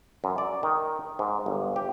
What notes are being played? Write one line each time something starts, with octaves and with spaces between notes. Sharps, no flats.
F#2
D5
D#3
G#2
G1
G4